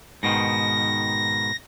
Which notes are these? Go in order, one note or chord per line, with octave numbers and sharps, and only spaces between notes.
G#2 B2 D#3 A#6